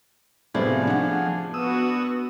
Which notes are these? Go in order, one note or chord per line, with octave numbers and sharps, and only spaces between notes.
A2 C3 F3 A3 B3 G#4 C5 D5
A3 D4 F#5
B3 F#4 D#6 E6